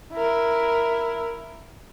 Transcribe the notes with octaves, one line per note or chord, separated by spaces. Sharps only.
E4 A#4